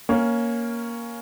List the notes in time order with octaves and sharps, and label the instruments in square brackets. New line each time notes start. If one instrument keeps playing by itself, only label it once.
[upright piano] A#3 C#4